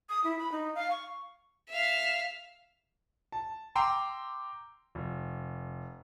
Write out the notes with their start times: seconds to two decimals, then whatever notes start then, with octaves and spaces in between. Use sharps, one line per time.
0.09 D#6
0.24 E4
0.39 B5
0.52 D#4
0.75 F5
0.91 C#6
1.69 E5 F5
3.32 A5
3.75 G5 A#5 C6 D6 E6
4.95 F1